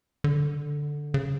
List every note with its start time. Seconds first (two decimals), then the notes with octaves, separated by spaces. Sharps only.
0.24 D3
1.14 C#3